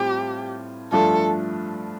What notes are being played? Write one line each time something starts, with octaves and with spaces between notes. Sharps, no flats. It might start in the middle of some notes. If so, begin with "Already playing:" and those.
Already playing: A2 G3 C4 F4 G4
G2 F3 A3 D4 F4 A4